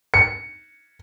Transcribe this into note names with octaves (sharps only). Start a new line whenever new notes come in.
C#7